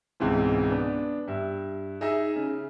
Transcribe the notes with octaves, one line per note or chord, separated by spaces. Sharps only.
C#2 G#2 B2 E3 C4
B3 D4
G2 E5
D#4 G#4 D#5 E5
C#3